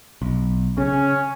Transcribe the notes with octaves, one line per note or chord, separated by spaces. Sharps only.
B1
C#3 C#4